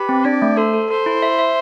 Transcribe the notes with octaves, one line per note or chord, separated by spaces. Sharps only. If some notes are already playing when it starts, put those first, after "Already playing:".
Already playing: G4 B4
C4
D4 D5
A3
A4 C5
A4
A4 C5
E4
E5
E5